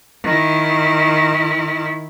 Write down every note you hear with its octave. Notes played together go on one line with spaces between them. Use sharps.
D#3 E4